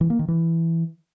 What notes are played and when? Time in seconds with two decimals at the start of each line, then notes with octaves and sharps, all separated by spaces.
0.01 E3
0.10 A#3
0.19 D#3
0.28 E3